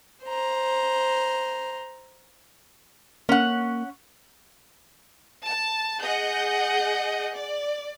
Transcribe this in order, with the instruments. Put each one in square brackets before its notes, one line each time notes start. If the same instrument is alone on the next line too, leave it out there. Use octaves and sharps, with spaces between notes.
[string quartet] C5 A#5
[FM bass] A#3 [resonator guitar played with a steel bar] C#4 F#5
[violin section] A5
G#4 D#5 F#5 G6
D5